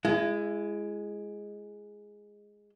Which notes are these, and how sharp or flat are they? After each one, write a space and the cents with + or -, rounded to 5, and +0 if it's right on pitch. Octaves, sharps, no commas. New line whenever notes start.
G#3 +0 E4 +35